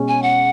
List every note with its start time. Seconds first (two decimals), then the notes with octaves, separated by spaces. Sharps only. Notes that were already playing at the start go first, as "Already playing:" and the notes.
Already playing: B2 G#3 C#4
0.08 G#5
0.23 F#5